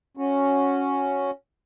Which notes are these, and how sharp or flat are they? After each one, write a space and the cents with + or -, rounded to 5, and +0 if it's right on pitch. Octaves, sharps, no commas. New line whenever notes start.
C#4 +0 F#4 -10